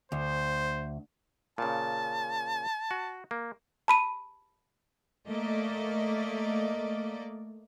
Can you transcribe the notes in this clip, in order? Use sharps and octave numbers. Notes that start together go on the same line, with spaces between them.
D2 C5
A#2 C#3 A5
F#4
A#3
A5 B5 D#7
A3 A#3 D5 D#5